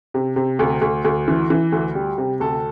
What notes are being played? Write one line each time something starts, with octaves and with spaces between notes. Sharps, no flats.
C3
C3
D2
D2
D2
E3
E3
D2
G3
C3
D2 A4